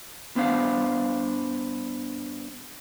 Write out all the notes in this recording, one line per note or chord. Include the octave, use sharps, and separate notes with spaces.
G2 B3 D4 C5 F5